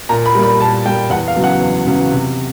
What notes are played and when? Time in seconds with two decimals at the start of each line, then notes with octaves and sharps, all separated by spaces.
0.09 A#2 A#5
0.26 B5
0.35 G3 A#3
0.43 B5
0.60 A#2 A5
0.85 G3 A#3 G5
1.10 E2 F#5
1.28 F5
1.36 C#3 F#3 B3
1.44 F#5
1.61 E2
1.87 C#3 F#3 B3
2.11 C3